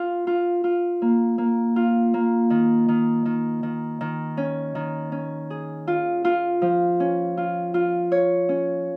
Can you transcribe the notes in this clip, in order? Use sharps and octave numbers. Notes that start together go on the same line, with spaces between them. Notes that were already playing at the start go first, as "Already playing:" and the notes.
Already playing: F4
F4
F4
A#3
A#3
F4
A#3
D#3
D#3
D#3
D#3
D#3
C#4
D#3
C#4
G#4
F4
F4
F3
C#4
F4
F4
C#5
C#4